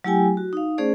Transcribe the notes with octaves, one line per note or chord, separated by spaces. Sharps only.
F#3 A3 E4 G4 G5 G#5
F#4
D#4 F5
A3 C#4 G#4 C5 D5